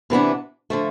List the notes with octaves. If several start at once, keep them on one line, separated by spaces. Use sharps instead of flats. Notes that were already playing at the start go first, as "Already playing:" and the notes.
C3 E3 B3 D4
D3 F3 A3